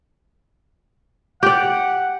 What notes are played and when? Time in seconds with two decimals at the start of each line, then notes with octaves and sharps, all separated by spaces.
1.43 G4 D5 F#5